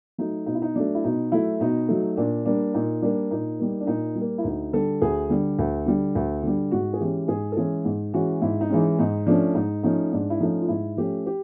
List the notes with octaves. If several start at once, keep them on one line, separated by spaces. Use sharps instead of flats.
F#3 A3 D#4
B2 D#4
E4
D#4
F#3 A3 D4
E4
B2 D#4
F#3 A3 E4
B2 D#4
F#3 A3
A#2 D4
G3 A#3 D4
A#2 D#4
G3 A#3 D4
A#2 D#4
G3 A#3
D4
A#2 D#4
G3
A#3
E4
D2 D#4
D3 G3 A4
D2 G#4
D3 G3
D2
D3 G3
D2
D3 G3
G#2 F#4
G#4
E3 G#3 C#4 G4
G#2 G#4
A4
E3 G#3 C#4 G#4
G#2
E3 G#3 C#4 F#4
G#2 E4
D#4
E3 G#3 C#4
G#2 D#4
F3 A3 C#4 D4
G#2 D#4
F3 A3 C#4 D#4
G#2 D4
E4
F3 A3 C#4 D#4
F4
G#2 E4
F3 A3 C#4 G4
G4